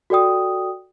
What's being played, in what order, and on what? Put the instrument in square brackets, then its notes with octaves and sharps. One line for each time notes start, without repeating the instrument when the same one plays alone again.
[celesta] F#4 A4 D5 G5 D#6